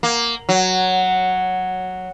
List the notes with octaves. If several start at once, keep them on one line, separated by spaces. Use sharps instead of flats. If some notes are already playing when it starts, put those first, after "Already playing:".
A#3
F#3